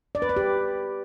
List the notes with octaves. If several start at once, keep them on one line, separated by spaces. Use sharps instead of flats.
D5
B4
D5
G4